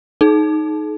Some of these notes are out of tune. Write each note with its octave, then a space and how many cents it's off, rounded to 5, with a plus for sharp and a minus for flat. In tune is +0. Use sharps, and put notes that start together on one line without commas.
D#4 +0 G#4 +45